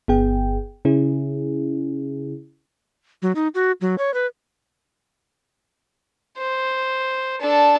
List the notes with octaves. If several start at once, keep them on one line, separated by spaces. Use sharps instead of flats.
G1 B3 G#4 G5
C#3 C#4 E4 G#4
F#3
D#4
F#4
F#3
C#5
B4
C5
D4 A4